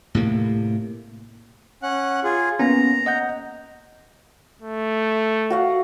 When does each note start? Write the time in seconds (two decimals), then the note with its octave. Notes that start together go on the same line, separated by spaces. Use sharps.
0.15 A2 C3 A#3
1.83 C#4 F#5 F#6
2.24 F4 G#4
2.59 A#3 B3 C#4 A#5
3.06 D#5 F#5 G6
4.62 A3
5.50 F#4 F5 F#5